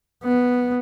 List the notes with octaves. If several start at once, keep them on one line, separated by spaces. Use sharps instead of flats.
B3